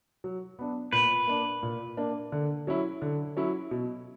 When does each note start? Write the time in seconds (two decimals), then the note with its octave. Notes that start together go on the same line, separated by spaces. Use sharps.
0.24 F#3
0.59 B3 D4
0.92 A#2 B4
1.27 A#3 D4
1.63 A#2
1.97 A#3 D4
2.32 D3
2.67 F#3 C#4 E4
3.02 D3
3.37 F#3 C#4 E4
3.71 B2